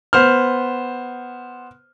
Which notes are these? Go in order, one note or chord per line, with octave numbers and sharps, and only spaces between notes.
B3 C5 F6